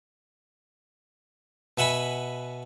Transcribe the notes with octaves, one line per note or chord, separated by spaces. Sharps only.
B2 E5 F#5 G#5 B5